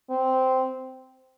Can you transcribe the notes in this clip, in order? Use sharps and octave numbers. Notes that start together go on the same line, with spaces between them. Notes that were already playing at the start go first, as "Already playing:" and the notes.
C4